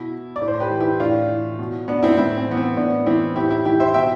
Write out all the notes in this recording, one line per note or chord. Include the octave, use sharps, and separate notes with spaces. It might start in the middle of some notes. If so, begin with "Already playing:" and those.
Already playing: B2 E4
D5
A2
C5
G4 B4
E3
E4 G4
A2 D4 F4
E3
B2
B3 D4
C4 E4
A2 C4 E4
C4
E3 B3
C4
A2 B3 D4
E3 C4 E4
A2 E4 G4
E4 G4
E3 E4 G4
C5 E5
B2 E5 G5